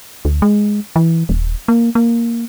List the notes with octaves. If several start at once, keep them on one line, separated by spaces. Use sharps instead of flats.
D2
G#3
E3
D#1
A#3
A#3